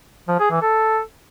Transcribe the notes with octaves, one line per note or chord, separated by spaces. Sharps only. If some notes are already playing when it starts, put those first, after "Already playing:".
F3
G#4
E3
A4